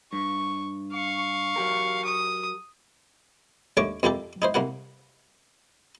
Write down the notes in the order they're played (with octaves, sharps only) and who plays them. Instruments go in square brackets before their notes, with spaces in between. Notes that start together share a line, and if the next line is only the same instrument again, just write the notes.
[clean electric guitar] G2 [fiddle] C#6
[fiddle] F5 [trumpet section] C#6
[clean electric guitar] F#3 G4 A#4
[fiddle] D#6
[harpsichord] D#2 D3 A3 C#5 C#6 D6
F2 A#3 E4 G4 A4
D#4 E4 C5
C2 A#3 E4 F#5